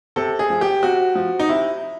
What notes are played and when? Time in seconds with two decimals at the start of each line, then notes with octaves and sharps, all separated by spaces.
0.16 C3 A4
0.39 G#4
0.50 F3
0.61 G4
0.82 C3 F#4
1.15 F3
1.39 D#4
1.49 C3 E4